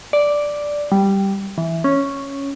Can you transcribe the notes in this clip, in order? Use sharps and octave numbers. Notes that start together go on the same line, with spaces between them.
D5
G3
E3
C#4